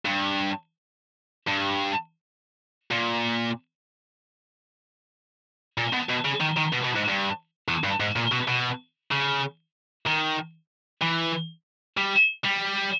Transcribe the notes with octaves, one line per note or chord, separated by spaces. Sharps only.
G2
G2
A#2
A#2
B2
B2
C#3
D#3
D#3
B2
B2
G#2
G2
E2
G2
G#2
A#2
B2
B2
C#3
D#3
E3
G3
G3